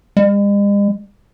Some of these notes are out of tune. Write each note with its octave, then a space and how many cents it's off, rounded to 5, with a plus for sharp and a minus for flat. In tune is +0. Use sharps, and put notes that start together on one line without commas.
G#3 -45